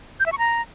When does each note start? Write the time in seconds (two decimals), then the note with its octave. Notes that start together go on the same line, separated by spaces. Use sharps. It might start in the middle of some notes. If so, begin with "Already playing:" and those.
0.20 G6
0.26 E5
0.32 C#6
0.38 A#5